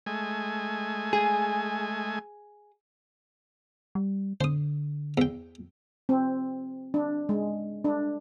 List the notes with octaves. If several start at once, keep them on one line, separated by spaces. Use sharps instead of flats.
G#3 A3 G#5
G#4
G3
D3 C5 D#6
E2 G5
C4
D4
G#3
D4